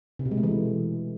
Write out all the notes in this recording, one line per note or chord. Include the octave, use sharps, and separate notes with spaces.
C3
B2
G#3
A3
E3